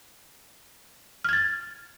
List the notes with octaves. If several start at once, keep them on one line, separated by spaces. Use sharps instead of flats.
F6 G#6 A6